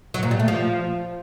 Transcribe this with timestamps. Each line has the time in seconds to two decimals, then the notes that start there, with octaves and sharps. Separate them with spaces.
0.14 F#3
0.23 A#2
0.31 G3
0.40 A3
0.48 F3